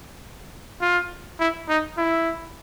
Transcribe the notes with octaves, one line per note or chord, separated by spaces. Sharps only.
F4
E4
D#4
E4